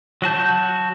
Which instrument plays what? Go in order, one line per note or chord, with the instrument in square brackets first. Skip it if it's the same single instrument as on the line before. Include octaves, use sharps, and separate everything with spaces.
[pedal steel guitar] F#3 F#4 A5 G6